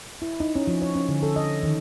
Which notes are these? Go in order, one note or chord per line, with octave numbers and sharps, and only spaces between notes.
E4
D#4
C#4
F3
C#5
C#4
D3
A4
D#5
D#3